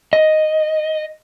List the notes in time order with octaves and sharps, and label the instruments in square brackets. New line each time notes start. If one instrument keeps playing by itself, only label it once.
[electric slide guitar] D#5